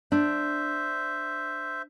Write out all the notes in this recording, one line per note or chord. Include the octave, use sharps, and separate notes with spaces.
D4 C5 E5